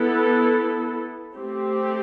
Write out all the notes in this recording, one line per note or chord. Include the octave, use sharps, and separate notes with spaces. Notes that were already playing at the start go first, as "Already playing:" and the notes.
Already playing: B3 E4 A4
A3 C4 G4